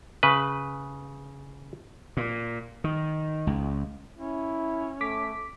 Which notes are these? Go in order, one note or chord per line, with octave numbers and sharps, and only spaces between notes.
C#3 B4
A#2
D#3
C#2
C#4 E4
A3 D6 B6